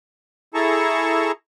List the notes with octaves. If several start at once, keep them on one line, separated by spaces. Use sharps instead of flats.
E4 G#4 A4 A5 A#5 C#6